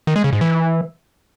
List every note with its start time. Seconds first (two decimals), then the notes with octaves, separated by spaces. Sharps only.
0.07 D#3
0.16 G#3
0.24 C#3
0.33 G#2
0.41 E3